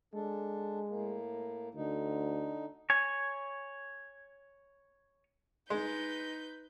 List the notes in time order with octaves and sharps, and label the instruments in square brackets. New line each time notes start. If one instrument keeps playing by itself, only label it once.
[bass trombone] G#3 [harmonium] D4 A4
[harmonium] A2 A#3
[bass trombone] D2 [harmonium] D3 D#4
[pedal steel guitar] C#5 G#5
[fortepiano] G#3 [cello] D#4 [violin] B4 G6